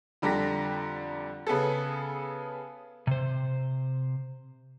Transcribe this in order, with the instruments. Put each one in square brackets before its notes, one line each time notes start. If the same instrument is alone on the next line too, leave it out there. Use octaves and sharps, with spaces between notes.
[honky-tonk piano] F2 D3 G3 A#5 A#6 B6
C#3 B3 G#4 A4
[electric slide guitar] C3 C5